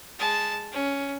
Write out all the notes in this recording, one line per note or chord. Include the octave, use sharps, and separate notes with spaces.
G#3 A5
C#4